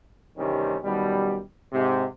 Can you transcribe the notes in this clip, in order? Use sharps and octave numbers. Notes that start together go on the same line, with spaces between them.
E2 G2 C3 D#3 G3 C#4
F#2 B2 D#3 G3
G#2 C3